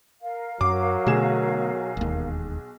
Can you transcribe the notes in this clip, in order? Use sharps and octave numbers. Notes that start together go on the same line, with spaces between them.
A#4 F5
F#2 F#3 D6
B1 B2 D3 A3 G#4 E7
E1 D#2